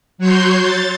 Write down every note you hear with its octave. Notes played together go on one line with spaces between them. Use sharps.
F#3 F#4 C#5 C6 G6
A6